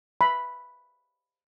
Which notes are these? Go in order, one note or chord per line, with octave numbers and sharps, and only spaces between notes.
B5